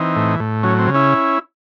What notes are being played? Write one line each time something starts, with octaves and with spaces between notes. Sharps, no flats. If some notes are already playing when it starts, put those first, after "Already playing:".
Already playing: E3 C4 D#4
A2
A2
F#3 C#4
C4
C#3
C#4 E4